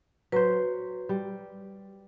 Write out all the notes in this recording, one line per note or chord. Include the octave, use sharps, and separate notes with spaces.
F#3 B4 C5
G3